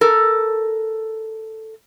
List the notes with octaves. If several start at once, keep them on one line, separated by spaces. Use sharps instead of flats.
A4 A#4